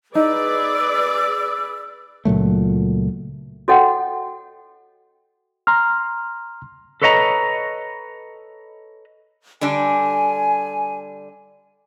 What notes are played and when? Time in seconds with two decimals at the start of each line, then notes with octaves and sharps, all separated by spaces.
0.15 D#4 G#4 B4 D5 E6
2.25 C#2 A#2 F#3 A3
3.68 F#4 A4 C#5 D#5 F#5 G5
5.67 A#5 C6 F6
7.02 A4 B4 C#5 D#5 F#5 A#5
9.61 D3 G3 D4 G#5